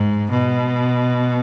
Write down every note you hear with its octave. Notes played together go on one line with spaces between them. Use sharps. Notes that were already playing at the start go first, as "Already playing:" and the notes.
Already playing: G#2
B2